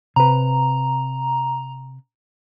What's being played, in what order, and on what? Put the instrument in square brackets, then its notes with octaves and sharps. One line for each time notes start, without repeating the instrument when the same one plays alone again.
[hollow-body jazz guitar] C3 B4 [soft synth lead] A#5